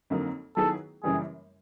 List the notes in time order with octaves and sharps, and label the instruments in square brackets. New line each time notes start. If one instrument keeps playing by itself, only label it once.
[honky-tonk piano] F2 D3 F#3 A#3 D#4
[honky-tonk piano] D#3 F#3 B3 E4 G#4 [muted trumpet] A4
[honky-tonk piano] F#2 C#3 E3 G3 A#3 [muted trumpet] G#4